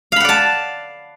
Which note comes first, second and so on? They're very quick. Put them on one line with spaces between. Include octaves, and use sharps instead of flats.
F5 B5 F#5 D5 A5